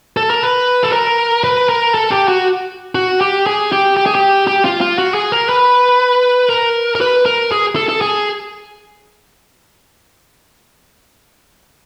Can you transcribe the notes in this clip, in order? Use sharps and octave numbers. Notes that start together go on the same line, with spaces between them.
A4
A#4
B4
A4
A#4
B4
A#4
A4
G4
F#4
F#4
G4
G#4
G4
G4
G#4
G4
G4
F4
F4
F#4
G#4
A#4
B4
A#4
A#4
B4
A#4
G#4
A4
A4
G#4